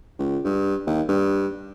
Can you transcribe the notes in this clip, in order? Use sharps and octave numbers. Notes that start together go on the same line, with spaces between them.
C#2
G2
D#2
G2